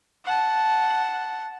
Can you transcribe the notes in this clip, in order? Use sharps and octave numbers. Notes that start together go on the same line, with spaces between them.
F#5 A5